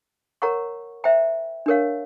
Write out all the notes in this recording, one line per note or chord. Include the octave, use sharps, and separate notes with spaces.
A#4 C#5 F#5 A#5 C#6
C5 E5 G5 A#5
D4 G4 A#4 C#5 F5